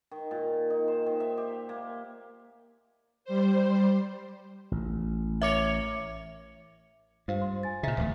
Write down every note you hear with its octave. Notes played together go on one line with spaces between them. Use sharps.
D#3
A#2
D#4
C5
D#3
E5
G4
A#3
G3 C5
A1
A#4 C#5 E5 D6 C#7
G2 F4 C5 F5
C6
G#5 A6
A#2 C#3 D#5 E5 A#5
D1 E2 A3